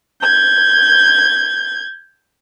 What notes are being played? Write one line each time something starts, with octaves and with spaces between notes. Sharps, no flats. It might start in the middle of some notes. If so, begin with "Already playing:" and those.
G6 G#6